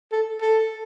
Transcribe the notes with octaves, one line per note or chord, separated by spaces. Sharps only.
A4
A4